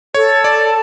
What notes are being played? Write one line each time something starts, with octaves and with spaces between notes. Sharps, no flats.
A4 C#5
D5 A5